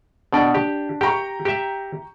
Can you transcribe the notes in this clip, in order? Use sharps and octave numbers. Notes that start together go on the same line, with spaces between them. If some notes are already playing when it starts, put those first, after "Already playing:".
B2 D4 D5 G5
G4
G4 G5 A#5 C#6
G4 E5